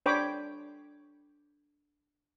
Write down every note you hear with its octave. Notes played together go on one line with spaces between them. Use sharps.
D4 C5 C#5 G5 B5 D6